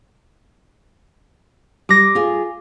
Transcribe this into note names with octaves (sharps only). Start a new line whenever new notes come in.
G3 D6 A#6
F4 G#4